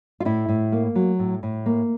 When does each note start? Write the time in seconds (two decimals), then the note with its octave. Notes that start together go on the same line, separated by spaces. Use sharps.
0.20 F4
0.25 A2 E4
0.49 A2
0.72 A#3
0.95 F#3
1.19 A2
1.43 A2
1.66 A#3